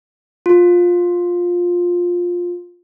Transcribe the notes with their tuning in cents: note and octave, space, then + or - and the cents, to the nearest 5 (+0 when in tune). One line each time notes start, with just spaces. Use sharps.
F4 +15